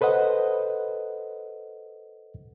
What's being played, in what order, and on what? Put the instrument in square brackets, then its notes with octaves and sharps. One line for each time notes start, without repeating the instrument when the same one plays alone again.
[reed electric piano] A4 B4 C5 D#5 F#5